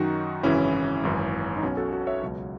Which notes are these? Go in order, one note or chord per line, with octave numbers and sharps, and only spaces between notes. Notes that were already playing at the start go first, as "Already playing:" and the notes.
Already playing: F#2 D#3 F#3 D#4 F#4
G#1 F#2 C#3 E3 C#4 E4
G#1 F#2 E3
D#4
B1 B2 F#3 C#4
F#4 A4
F#4 A4
C#5 E5
C#2 B2 F#3